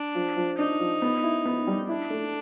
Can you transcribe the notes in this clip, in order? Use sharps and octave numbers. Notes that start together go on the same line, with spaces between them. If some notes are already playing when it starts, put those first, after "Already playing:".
Already playing: D4
F3
F3
D4 D#4
F3
B3
E4
B3
G3
D4 E4
A3